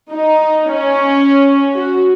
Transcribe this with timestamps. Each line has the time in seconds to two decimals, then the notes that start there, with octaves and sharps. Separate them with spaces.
0.12 D#4
0.73 C#4
1.74 F#4